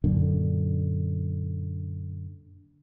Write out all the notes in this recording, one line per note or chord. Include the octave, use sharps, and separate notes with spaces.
F#2 A#2 D3